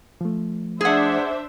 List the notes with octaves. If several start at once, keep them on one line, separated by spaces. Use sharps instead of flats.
F3 A3
D4 G#4 C5 E5 F#5